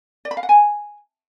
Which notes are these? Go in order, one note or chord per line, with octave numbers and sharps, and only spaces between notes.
D5
B5
F5
F#5
G#5